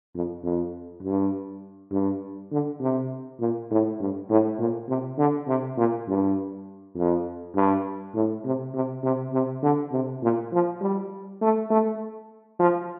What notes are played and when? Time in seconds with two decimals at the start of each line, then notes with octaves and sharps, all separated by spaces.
0.15 F2
0.44 F2
1.03 G2
1.92 G2
2.52 D3
2.81 C3
3.40 A#2
3.71 A2
4.00 G2
4.29 A2
4.59 A#2
4.89 C3
5.18 D3
5.48 C3
5.77 A#2
6.08 G2
6.97 F2
7.56 G2
8.15 A2
8.45 C3
8.75 C3
9.03 C3
9.33 C3
9.63 D3
9.92 C3
10.23 A#2
10.53 F3
10.81 G3
11.42 A3
11.71 A3
12.60 F3